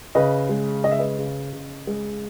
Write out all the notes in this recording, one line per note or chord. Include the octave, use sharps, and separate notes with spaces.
C#3 B4 D#5
G#3
C#3 D#5
E5
B4 D#5
C#3
C#3
G#3